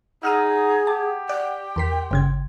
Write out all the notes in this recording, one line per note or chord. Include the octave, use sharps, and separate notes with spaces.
D#4 G#4 F#5 E6 F6 D#7
G4 A5
D5 G5 F#6
E2 A#4 C6 B6
G1 C#3 G#6